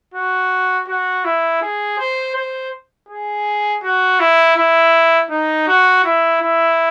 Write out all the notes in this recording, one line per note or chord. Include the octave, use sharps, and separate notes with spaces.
F#4
F#4
E4
G#4
C5
C5
G#4
F#4
E4
E4
D#4
F#4
E4
E4